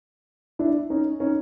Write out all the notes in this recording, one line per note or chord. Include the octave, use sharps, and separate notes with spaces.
D4 E4
C#4 D#4
C#4 D#4